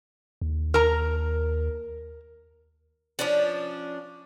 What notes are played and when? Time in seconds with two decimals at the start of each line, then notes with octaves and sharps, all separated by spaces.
0.41 D#2
0.74 A#4 A#5
3.19 F3 C#4 D4